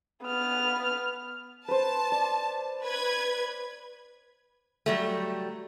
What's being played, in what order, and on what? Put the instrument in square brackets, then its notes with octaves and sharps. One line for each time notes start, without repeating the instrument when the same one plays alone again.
[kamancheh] B3 F6
[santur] B4 C5 [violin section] A5
[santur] D5
[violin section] B4 G#6
[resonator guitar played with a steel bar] F#3 G3 A3